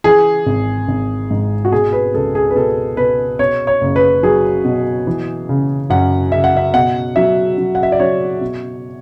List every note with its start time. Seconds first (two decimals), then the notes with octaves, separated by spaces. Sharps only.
0.04 E3 G#4
0.46 G#1
0.88 G#1
1.31 G#2
1.65 F#4
1.72 B2 G#4
1.93 B4
2.14 C#2 A4
2.35 G#4
2.51 B4
2.55 B2 A4
2.97 B2 B4
3.39 B2 C#5
3.67 C#5
3.81 F#1
3.96 B4
4.23 F#3 G#4
4.65 B2
5.07 E3
5.49 C#3
5.90 F#2 F#5
6.32 C#3 E5
6.44 F#5
6.57 E5
6.74 B2 F#5
7.16 F#3 E5
7.58 F#3
7.75 F#5
7.83 E5
7.92 D5
7.99 F#3 C#5
8.41 B2